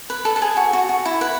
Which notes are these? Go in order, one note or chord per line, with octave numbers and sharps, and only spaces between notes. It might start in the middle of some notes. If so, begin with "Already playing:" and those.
B4
A4
A4
G#4
F#4
F#4
F#4
E4
B4